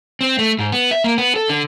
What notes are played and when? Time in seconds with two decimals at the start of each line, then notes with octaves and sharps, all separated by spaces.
0.21 C4
0.39 A3
0.59 G#2
0.72 B3
0.91 E5
1.04 A#3
1.18 B3
1.36 A4
1.50 D3